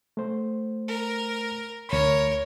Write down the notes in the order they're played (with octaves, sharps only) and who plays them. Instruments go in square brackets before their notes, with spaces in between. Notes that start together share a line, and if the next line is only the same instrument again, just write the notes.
[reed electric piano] A3 C5
[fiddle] A#4
[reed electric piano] D2 B5 [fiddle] A#4 C#5